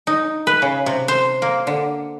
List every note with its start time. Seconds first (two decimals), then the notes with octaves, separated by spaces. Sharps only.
0.07 D#4
0.47 B4
0.62 C#3
0.86 C3
1.08 C5
1.42 A#3
1.67 D3